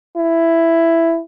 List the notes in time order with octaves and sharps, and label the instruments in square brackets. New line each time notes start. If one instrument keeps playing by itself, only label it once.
[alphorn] E4